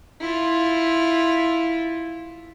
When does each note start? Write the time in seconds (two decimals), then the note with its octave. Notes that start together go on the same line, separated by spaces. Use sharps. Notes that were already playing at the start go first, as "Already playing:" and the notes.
0.21 E4 F4